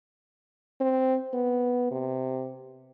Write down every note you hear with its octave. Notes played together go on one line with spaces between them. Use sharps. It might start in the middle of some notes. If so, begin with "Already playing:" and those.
C4
B3
C3